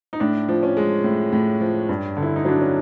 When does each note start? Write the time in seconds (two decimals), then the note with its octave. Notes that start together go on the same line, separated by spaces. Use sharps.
0.13 D#4
0.20 A2 D4
0.48 F3
0.63 C#4
0.77 G#3
1.04 A2
1.32 A2
1.61 F3
1.89 G2
2.17 D3
2.23 E4
2.36 D#4
2.45 F#3 D4
2.61 C#4